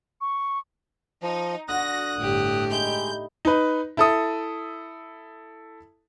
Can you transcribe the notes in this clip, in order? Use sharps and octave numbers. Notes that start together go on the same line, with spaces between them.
C#6
F3 D#4
D3 F#4 D#6 F#6 A#6
G1 A2 G4
G#3 D#4 E4 G6
D#4 B4
E4 A4 D#6